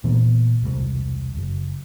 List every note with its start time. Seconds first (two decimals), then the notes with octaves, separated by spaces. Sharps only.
0.04 A#2 E3 A#3 B3
0.62 E1 C2
1.37 F#1